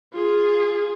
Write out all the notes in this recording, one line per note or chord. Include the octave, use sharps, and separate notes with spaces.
F4 G#4